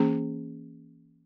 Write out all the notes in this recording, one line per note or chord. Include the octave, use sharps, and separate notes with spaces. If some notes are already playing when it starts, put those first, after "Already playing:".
Already playing: E3 A#3 C#4 G#4